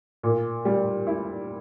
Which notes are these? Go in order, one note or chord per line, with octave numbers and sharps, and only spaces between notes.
A#2
G3
E4